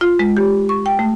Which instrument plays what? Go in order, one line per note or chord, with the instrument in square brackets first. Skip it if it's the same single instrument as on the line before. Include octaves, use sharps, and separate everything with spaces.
[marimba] F4
G#3
G4
C#6
G5
A3